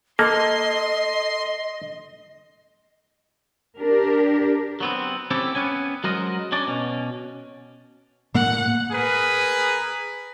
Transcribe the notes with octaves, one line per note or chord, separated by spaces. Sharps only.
A#3 A4 D#5 C6
D4 G4 A#4
F#3 B3 C4
C4 C#4 E4 G4 A4
B3 C#4 G#5
F#3 G#3 F#4 A#4 C5 D#5
C#4 D4 D5
B2 C#4
A2 A3 A#3 F#5
G#4 A#4 B4